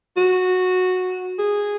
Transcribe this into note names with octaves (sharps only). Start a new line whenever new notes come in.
F#4
G#4